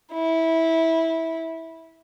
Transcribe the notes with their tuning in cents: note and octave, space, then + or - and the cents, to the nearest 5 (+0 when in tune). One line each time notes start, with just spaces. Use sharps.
E4 -15